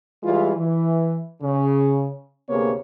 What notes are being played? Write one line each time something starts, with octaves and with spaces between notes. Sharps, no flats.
E3 G3 G#3 E4 F4
E3
C#3
D2 C3 A#3 B3 G#4 C#5